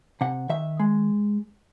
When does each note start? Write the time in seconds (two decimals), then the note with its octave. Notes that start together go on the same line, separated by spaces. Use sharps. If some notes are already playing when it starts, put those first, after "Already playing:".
0.21 C3 F#5
0.49 D#3 E5
0.80 G#3